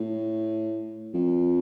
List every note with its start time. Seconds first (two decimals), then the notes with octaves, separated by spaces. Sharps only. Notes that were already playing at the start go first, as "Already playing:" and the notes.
Already playing: A2
1.14 F2